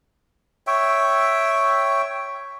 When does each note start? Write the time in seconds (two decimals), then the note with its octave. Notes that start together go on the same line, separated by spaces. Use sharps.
0.67 C#5 E5 G5